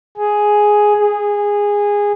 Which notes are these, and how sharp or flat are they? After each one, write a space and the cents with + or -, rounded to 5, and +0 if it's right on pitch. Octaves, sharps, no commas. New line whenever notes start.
G#4 +5
G#4 -15